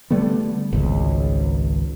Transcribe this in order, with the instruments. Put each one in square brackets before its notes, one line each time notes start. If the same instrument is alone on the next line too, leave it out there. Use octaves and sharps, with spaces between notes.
[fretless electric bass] D3 G3 A3 B3
G#1 C#2